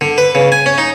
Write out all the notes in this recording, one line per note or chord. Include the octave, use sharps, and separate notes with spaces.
D3
B4
C#3
G#5
C#4
D#4